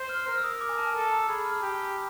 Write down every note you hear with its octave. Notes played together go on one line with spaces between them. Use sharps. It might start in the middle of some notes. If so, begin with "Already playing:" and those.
Already playing: C5
F6
A#4 F6
E6
D#6
D6
G#5
A5
G#5
A4 A5
A5
A#5
G#4 B5
F6
G4